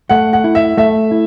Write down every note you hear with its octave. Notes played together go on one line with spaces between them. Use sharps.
A3 F#5
F#5
E4
E5
A3 E5
E4